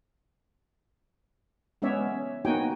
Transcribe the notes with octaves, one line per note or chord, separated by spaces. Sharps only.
G#3 B3 C#4 C#5 D5 E5
A#3 B3 D#4 F#4 G5 G#5